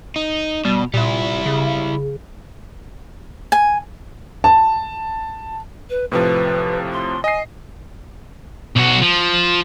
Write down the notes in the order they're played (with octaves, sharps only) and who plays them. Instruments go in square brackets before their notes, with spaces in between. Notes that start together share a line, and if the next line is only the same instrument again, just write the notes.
[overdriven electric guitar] D#4
[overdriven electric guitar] B2 [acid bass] G3
[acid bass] A#2 [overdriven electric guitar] G3 E4
[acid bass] C#3
[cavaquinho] G#5
[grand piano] A5
[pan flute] B4
[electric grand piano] A2 C3 F3 [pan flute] B4
[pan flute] C6
[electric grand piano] D#5 C7 [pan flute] G#5
[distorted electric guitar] B1 F#4
F3